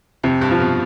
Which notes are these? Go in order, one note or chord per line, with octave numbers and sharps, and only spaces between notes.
F2 C3
G2
F3
B2